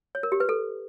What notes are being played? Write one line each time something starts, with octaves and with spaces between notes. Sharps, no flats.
C#5
A#4
G4
B4
A4